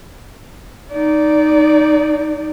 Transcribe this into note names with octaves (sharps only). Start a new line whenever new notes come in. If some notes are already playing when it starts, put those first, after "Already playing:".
D#4 D5